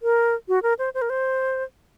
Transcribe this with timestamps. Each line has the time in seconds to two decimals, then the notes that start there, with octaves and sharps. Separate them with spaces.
0.03 A#4
0.48 F#4
0.63 A#4
0.79 C5
0.94 C5
1.02 A#4
1.10 C5